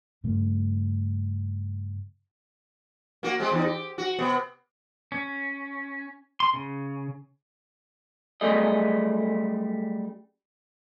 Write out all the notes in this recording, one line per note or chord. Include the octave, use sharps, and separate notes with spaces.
G2 C#3 A3
A#3 F#4
G#3 C4 G4
E2 D#4
G4
F#4
C3 B3
C#4
C6
C#3
F#2 G3 A3 G#4 D#5